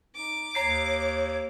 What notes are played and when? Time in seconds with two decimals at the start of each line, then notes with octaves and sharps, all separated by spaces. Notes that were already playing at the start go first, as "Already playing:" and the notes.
0.16 D#4 D6
0.55 D#2 C#5 A#5 C7